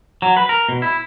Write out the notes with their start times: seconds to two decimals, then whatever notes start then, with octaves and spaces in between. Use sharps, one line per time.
0.22 F#3
0.37 B4
0.49 A#4
0.69 B2
0.82 E4